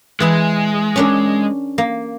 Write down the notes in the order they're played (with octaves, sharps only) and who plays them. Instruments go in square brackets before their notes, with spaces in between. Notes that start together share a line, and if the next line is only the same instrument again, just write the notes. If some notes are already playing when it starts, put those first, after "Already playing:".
[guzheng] E3 G#4 B5 [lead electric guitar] G#3
[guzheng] C#4 D4 A#4
A#3